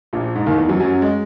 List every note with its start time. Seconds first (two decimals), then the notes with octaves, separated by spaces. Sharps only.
0.13 A#1 A#2
0.35 G#2
0.46 D#2 D#3
0.58 E2 E3
0.69 F#2 F#3
0.80 F#2 F#3
1.02 G#3